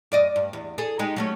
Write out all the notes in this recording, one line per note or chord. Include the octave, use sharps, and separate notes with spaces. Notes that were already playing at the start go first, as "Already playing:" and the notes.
F#2 D5 D#5
G2
E2
G#4 A4
G#3 D#4 G4
F#3 A3 C#4